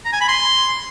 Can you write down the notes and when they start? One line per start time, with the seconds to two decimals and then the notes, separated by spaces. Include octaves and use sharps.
0.05 A#5
0.13 G#5
0.21 B5
0.28 C6